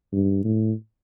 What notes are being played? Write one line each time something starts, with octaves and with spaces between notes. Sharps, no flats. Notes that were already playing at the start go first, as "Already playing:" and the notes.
G2
A2